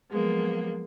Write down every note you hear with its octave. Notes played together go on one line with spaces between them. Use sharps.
F3 F#3 G#3 A#3 B3